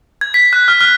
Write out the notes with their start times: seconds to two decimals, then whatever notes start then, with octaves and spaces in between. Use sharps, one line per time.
0.21 G#6
0.34 B6
0.53 F#6
0.68 F6
0.81 F6